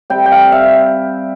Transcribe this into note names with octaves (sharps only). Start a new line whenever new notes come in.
C3 G3 G5
G5
F5
E5